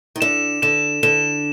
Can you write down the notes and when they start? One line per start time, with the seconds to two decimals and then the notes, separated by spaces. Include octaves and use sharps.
0.16 D#3
0.21 D3 E7
0.62 D3 E7
1.03 D3 E7